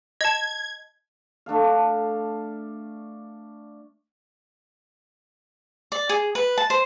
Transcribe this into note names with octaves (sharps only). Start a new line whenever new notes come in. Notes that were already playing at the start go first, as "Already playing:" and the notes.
D#5 A5 G#6
A3 D4 A4 F5
D5
G#4
B4
A5
C5